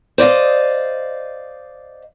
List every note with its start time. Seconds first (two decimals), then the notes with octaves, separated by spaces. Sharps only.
0.18 C5 D5 D#5 F5